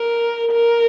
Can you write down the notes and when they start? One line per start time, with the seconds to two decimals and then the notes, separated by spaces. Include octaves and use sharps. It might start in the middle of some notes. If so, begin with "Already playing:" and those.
Already playing: A#4
0.52 A#4